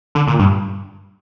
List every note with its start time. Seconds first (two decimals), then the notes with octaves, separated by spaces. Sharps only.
0.15 D3
0.27 A#2
0.39 G2